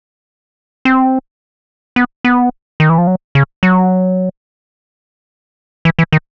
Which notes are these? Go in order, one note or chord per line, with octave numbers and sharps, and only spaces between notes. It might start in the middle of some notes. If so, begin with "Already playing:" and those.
C4
B3
B3
D#3
E3
F3
F#3
C#3
F#3
E3
E3
D#3